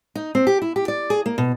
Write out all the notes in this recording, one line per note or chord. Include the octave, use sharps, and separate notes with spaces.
D#4
C4
G4
E4
G4
D5
G#4
A#3
B2